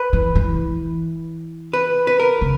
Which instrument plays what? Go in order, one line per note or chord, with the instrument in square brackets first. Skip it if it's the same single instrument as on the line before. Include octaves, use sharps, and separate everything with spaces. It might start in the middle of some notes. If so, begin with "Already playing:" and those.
Already playing: [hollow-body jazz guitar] B4
[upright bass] E3
E3
[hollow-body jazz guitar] B4
B4
A#4
[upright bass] C#3